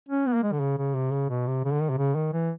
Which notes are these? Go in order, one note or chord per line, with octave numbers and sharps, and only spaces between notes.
C#4
B3
A#3
G#3
D3
C#3
C#3
C3
C#3
B2
C3
C#3
D3
D#3
C3
C#3
D#3
E3